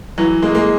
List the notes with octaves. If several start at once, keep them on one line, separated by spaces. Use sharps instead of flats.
E3 F#3
G#3 A#3
G#3 A#3